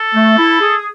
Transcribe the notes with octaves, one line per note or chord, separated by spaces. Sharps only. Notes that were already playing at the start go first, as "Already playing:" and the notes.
Already playing: A4
A3
E4
G#4